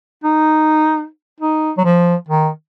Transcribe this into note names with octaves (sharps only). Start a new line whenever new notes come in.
D#4
D#4
F#3
F3
D#3